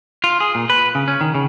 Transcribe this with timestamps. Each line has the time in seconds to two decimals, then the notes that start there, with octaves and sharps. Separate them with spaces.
0.24 F4
0.41 G#4
0.55 A#2
0.70 B4
0.95 C#3
1.08 C#4
1.21 D#3
1.35 C#3